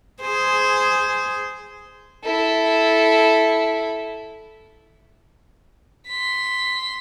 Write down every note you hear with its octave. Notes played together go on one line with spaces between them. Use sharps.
G#4 C5
E4 A4
C6 B6